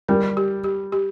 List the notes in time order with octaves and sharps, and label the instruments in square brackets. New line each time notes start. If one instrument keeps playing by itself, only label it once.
[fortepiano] G3 [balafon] A#4
[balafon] G4
G4
G4